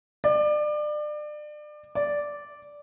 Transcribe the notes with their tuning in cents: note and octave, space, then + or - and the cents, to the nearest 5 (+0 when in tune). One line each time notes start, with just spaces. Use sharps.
D5 +30
D5 -5